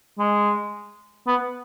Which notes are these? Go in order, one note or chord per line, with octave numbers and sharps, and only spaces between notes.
G#3
B3